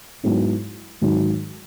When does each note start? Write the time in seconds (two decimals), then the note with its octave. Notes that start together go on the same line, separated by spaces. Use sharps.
0.24 G#2 F#3 B3 E4
1.01 G#2 D#3 F#3